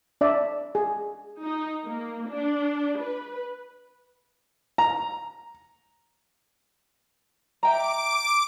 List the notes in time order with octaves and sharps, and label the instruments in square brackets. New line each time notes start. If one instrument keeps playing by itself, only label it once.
[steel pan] D4 D5 E5
G#4
[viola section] D#4
A#3
D4
B4
[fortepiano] A#5
[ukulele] E5 G5 A#5 [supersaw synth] D6 D7